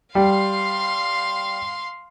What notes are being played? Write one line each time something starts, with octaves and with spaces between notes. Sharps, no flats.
G3 F5 C6